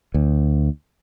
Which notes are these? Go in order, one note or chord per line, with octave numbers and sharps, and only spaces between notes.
D2